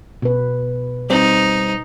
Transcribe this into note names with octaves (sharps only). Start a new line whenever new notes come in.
B2 B4
G3 C4 D#4